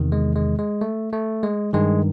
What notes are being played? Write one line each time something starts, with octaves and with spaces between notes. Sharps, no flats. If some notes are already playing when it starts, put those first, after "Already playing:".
Already playing: E2 C3 D#3
G#3
G#3
G#3
A3
A3
G#3
G2 D#3 G#3